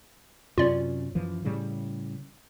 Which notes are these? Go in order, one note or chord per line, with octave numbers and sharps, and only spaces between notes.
F#2 C3 C#4 F4 D5
F#2 E3 F3
A2 C#3 G3